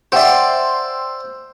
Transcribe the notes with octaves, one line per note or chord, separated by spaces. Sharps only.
C5 D5 E5 F#5 G5 C6 E6